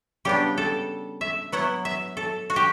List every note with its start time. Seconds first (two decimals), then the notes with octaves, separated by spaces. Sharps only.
0.25 C#3 G3 B3 D4 G4
0.58 A4
1.21 E5
1.52 F#3 B3 E4 F#5
1.85 E5
2.17 A4
2.50 F#4
2.56 G4